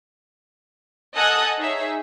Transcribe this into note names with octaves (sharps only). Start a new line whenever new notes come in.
A4 D#5 F#5 G#5 D#6 F#6
D#4 G#4 C#5 E5